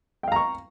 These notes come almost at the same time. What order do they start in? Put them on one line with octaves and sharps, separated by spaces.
G5 F5 A#5 C#6